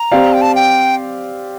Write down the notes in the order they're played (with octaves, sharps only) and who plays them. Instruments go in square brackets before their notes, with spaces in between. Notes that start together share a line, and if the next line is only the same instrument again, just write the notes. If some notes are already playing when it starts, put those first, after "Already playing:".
Already playing: [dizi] A#5
[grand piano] C4 G4 D5 F5
[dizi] G5
A5
G5